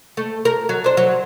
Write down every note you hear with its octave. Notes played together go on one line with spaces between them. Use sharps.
A3
A#4
F#3
D4 C5
F#3